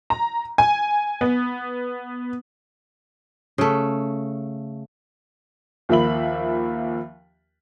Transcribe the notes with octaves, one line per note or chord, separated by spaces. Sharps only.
A#5
G#5
B3
C#3 A3
D#2 F3 A#3 E5 B5 F#7